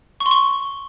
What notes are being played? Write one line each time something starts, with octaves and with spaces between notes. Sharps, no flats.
C#6
C6
C#6